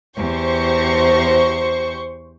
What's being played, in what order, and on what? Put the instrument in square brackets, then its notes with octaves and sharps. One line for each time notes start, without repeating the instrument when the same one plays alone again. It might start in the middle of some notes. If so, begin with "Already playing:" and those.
[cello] E2 G4 [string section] C5 C#6